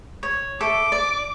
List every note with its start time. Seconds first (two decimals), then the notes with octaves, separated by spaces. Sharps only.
0.23 C#5
0.61 A4 E5 D6
0.92 D5